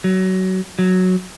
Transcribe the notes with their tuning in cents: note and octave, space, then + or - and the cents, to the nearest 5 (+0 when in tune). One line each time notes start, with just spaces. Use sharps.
F#3 +20
F#3 -5